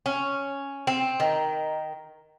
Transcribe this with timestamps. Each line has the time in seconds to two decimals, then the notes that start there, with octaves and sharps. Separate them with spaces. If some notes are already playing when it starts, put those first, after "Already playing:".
0.06 C#4
0.87 C4
1.20 D#3